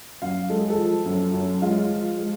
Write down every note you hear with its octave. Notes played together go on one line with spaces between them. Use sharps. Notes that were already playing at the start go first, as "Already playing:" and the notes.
F#2 F5
G#3 A4
G#4
A4
F3
F#2
F#2
G#3 F4
F3
G#3